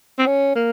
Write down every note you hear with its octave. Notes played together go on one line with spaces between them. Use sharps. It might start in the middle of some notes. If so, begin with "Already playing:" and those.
C4
C#4
A#3